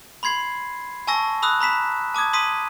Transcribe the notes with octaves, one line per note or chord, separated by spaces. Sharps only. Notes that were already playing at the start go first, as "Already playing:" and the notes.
B5 C6 G#6 C7
G#5 A5 C#6 E6 A#6
B5 D#6 E6 F#6
A#5 B5 B6 E7
A5 D6 D#6 G#6
C6 D#6 B6 D#7